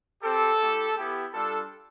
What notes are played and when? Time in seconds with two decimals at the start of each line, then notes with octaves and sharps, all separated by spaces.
0.22 C4 G4 A4
0.60 A3 E4 G4
0.96 B3 E4 G4
1.33 G3 D4 F4 A4